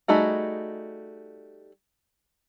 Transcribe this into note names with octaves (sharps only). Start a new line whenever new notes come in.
G3 A3 D#4 F#4 G#4